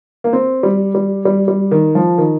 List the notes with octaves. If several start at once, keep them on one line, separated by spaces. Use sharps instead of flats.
A#3
C4
G3
G3
G3
G3
D#3
F3
D#3